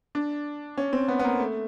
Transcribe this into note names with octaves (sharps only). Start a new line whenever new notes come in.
D4
C#4
C4
B3
B3
A#3
A3